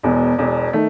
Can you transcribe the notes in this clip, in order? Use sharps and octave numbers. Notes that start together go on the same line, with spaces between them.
E1 E2 B2
E1 E2 B2
D#3 A3